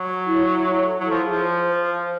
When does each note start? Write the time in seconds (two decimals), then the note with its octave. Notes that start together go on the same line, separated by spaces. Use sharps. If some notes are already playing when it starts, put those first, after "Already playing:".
Already playing: F#3
0.08 C#5
0.27 E4
0.45 E4
0.64 C#5
0.82 A4
1.00 F#3 E4
1.11 F3
1.19 G#4
1.31 F3
1.38 C5
1.56 C5
1.74 C5
1.92 C5